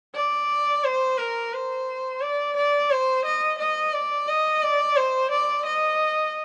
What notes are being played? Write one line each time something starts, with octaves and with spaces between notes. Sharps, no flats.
D5
C5
A#4
C5
D5
D5
C5
D#5
D#5
D5
D#5
D5
C5
D5
D#5